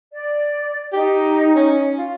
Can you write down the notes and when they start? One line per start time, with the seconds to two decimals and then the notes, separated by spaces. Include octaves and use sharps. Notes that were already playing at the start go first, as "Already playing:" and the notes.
0.12 D5
0.93 D#4 G4
1.56 C#4
1.98 F4